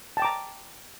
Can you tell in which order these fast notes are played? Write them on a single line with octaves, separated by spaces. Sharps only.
A5 G5 D6 A#5